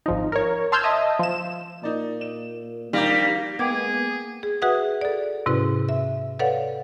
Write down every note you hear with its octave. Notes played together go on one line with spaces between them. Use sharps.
G#1 F3 D#4
A#4 C#5
A5 C6 E6 F6 G6 G#6
D#5 E5 A5 D#6
F3 E7
A#2 D#4 D5
E7
A#1 D#3 G3 A#3 D#4 A#6
G#3 A#3 B3 G#4 G5 D6 G#6
G#4
F#4 G#4 B4 E5 F#5 D#6
A4 D5
G#2 C3 C#4 E4 F#4 B4
E5
A4 B4 C#5 D5 F5 F#5